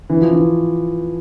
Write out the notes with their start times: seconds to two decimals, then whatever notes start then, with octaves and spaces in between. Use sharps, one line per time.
0.10 E3
0.21 F3
0.32 E3